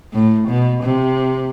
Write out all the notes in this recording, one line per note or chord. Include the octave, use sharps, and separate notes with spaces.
A2
B2
C3